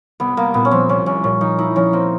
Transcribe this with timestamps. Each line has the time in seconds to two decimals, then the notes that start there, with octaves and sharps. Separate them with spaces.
0.20 C2 B3
0.37 C2 A#3
0.54 A#2 B3
0.65 C#4
0.71 F3 C4
0.89 C2 C#4
1.06 C2 C#4
1.24 A#2 C#4
1.41 F3 D#4
1.58 D#4 E4
1.76 F3 C#4
1.93 A#3 C4